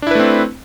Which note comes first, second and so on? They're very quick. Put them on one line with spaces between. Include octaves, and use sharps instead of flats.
D4 E4 B4 A3 C4